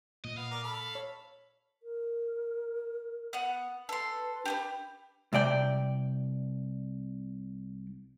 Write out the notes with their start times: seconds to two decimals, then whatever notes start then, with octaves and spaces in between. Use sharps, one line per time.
0.24 A#2 D#5
0.37 B3 F5
0.51 A#4 D5
0.63 A4 B5
0.95 C#5
1.83 A#4
3.33 B3 F#5
3.89 A4 B4 C6
4.45 D4 G4 G#4 B4
5.33 C2 C3 D5 G5